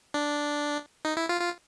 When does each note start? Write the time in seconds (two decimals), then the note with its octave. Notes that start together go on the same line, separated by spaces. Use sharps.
0.14 D4
1.05 D#4
1.17 E4
1.29 F4
1.41 F4